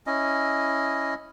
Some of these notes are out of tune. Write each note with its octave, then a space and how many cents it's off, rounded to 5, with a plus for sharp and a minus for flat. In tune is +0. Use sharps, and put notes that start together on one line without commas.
C#4 +0 E4 -5 D#5 +0